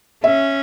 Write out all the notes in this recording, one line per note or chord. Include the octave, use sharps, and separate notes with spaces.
C#4 E5